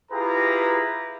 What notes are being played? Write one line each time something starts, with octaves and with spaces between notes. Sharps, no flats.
E4 F4 G4 G#4 B4 A#5